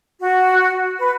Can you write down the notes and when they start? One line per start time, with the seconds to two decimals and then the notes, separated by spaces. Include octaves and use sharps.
0.21 F#4
0.99 B4